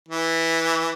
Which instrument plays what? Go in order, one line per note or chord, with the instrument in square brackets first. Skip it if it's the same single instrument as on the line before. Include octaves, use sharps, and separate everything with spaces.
[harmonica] E3